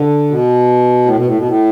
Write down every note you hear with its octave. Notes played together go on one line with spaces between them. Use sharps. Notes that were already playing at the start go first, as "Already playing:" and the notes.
Already playing: D3
B2
A2
B2
A2
B2
A2